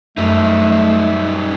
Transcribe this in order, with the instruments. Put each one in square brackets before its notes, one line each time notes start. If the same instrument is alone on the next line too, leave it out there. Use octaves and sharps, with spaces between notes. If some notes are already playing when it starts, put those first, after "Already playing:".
[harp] F#2 [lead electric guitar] G3 D#4 [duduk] A3 [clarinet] E5